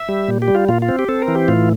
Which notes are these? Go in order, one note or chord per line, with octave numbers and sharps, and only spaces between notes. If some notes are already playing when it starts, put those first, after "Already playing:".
Already playing: E5
G3
A#2
G4
G3
F4
A#2 F4
F4
C4
G4
C4 A4
A#4
E3
G4
A2 F4